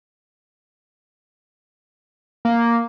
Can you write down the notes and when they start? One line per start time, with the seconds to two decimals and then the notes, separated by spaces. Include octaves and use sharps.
2.45 A#3